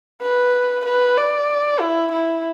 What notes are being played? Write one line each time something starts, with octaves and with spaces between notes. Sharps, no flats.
B4
B4
D5
E4
E4